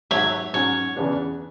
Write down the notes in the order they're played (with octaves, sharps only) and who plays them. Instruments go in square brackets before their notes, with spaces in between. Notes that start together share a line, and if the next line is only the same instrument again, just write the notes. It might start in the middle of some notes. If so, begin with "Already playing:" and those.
[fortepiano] G#1 G#2 F#3 [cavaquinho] C#5 E5
[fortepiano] G#2 F#3 C#4 [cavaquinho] C#5
[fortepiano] E2 C#3 E3 B3 D4